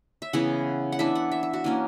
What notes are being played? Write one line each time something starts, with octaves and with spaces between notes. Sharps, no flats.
E5
C#3 E3 B3 F#5
F#5
E3 B3 D4 E5
F#5
E5
E5
F#4
E3 A#3 C#4 D4